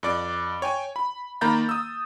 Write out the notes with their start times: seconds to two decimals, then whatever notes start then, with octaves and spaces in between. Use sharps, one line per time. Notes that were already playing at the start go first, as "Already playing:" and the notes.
0.03 F2 D5 D6
0.62 C#5 G5 G#5
0.96 B5
1.41 D#3 A#3 A#5 B5 G6 A6
1.69 D#6 E6